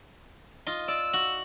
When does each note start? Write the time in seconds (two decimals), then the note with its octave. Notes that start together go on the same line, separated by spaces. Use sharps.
0.67 F4 D#5 C6
0.88 D5 E6
1.13 F#4 F#7